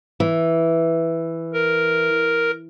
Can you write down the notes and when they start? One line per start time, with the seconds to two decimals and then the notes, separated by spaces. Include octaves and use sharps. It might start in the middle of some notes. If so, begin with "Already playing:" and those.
0.20 E3
1.53 A#4